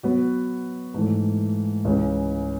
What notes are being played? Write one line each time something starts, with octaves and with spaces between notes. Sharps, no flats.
F#3 B3 F#4 B4
G#2 E3 A3
C#2 C#3 E3